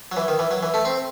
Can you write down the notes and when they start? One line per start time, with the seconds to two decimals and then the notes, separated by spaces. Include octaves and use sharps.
0.12 F#3
0.17 E3
0.28 D#3
0.39 E3
0.51 F#3
0.63 E3
0.74 A3
0.85 C4